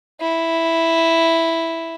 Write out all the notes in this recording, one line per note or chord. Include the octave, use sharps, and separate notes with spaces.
E4